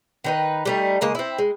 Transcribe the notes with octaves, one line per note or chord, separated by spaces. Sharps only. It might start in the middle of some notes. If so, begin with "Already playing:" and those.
D#3 D#4 B4
G3 A3 D#4
C#3 G#3 A#3 D#5
C4 E4
G#3